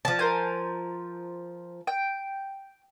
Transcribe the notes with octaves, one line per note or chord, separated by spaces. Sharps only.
F3 A5
A#4 C5 G#5
G5